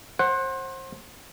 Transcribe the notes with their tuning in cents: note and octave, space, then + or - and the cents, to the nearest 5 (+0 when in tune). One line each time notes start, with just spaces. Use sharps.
C5 +30 F#5 +0